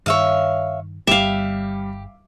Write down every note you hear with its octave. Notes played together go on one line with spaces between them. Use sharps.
G2 D#3 C#5 E5 F5
G1 G3 G4 E5 F5